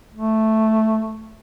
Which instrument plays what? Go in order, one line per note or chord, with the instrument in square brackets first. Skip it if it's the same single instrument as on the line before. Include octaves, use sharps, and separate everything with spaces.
[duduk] A3